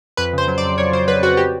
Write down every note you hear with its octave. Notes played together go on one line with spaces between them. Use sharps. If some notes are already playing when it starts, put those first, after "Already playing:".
F2 B4
C#3 C5
F#3
D5
F2
F2 C#5
C#3 C5
F#3 B4
F2 F#4
G4